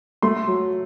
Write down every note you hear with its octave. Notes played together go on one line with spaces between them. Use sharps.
A3 C6
F#3